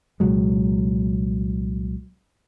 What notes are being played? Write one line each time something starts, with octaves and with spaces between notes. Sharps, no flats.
C2 A#2 F#3 G#3